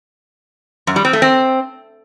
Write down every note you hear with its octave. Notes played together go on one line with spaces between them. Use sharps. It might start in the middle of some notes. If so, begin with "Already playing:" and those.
F#2
G3
C4
A3
C4